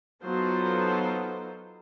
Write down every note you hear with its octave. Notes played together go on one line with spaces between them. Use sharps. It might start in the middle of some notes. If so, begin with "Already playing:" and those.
F#3 B3 D#4 F4 A4 C5